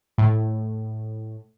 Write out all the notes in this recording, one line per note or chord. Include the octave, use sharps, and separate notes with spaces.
A2